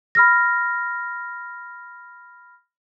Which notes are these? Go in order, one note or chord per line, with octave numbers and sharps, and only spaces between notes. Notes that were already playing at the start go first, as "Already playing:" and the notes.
B5 F6 A#6